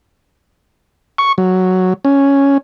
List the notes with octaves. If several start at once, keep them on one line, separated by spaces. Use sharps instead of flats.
C#6
F#3
C#4